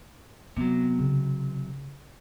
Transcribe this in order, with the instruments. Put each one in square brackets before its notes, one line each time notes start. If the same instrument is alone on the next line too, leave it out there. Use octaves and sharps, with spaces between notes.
[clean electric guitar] C3 F#3 [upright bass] B3
[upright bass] C#3